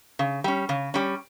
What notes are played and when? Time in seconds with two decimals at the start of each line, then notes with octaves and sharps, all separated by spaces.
0.19 C#3
0.44 G3 C#4
0.69 C#3
0.94 G3 C#4